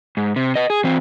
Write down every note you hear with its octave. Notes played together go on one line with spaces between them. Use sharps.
G#2
C3
B4 D#5
G#4
E3 C4